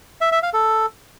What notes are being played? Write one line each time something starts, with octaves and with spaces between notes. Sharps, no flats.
E5
E5
F5
A4